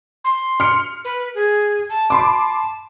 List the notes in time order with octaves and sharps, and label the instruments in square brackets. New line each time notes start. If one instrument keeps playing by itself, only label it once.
[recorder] C6
[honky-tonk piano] F6 C#7
[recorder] B4
G#4
A5
[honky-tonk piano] B5 C6 D6